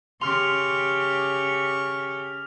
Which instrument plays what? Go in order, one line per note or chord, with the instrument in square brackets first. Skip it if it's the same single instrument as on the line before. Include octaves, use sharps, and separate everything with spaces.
[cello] C#3 G4 [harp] C6 [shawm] C#6 [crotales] F6 F7